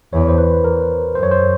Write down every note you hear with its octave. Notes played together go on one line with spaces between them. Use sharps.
E2 C#5
C5
B4
A#4
F#2 C5
C#5
C5